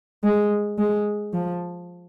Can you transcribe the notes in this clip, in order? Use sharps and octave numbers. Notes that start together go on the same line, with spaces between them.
G#3
G#3
F3